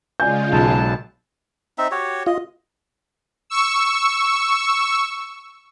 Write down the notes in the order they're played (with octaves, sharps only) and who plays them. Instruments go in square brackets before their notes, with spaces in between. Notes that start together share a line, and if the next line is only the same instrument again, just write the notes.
[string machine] C#3 G#3 F4 [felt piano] D5 G#5 G6
[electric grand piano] B1 [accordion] F#2 A5
[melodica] C4 D#4 E5
F#4 G4 C#5
[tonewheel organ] F4 [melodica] D#5
[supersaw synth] C#6 E6